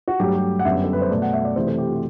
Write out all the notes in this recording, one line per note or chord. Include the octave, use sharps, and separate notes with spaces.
F#4
G2 F#3 A3 G4
G4
F#5
F#2 D3 G3 B3 E5
G4
A4
B4
C5
B2 A3 D5
F#5
E5
D5
C3 E3 A3 C5
A4
G4
F#4